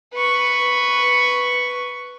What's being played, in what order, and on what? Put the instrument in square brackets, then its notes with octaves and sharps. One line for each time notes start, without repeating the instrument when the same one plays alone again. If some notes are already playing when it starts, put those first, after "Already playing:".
[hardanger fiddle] B4 C#6